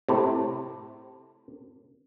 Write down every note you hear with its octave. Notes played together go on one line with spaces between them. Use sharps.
A2 C3